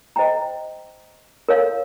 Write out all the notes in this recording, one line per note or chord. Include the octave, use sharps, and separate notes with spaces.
C5 D#5 G5 A#5
A#4 C#5 F5